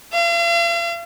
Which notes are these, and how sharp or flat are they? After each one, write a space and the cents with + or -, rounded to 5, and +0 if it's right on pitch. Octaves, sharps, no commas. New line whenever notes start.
F5 -45